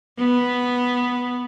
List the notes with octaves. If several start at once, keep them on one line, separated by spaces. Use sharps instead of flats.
B3